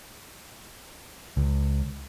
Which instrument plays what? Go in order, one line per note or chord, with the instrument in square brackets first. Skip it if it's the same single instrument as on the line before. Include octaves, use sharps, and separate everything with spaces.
[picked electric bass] C#2